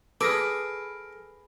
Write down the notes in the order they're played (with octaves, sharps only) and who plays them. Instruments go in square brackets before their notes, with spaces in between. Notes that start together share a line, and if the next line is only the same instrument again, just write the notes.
[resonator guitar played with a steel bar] G#4 B4 [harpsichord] A4 [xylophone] D6 D#6 [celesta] F6 A#6 D7